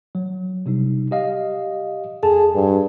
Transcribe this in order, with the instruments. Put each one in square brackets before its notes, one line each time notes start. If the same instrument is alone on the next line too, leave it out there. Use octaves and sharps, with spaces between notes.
[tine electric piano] F#3
C3 G3 D#4
G4 D#5 F5
[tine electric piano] F2 A4 A5 [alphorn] G#4
[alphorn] G2